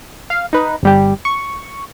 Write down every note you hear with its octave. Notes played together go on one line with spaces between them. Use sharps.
F5
D#4 B4
G1 G3 G4
C#6